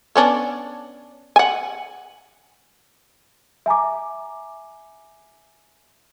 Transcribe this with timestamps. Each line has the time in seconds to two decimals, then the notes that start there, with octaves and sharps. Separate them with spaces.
0.16 B3 C#4 D4
1.36 F#5 G#5
3.66 E5 G#5 A#5 D6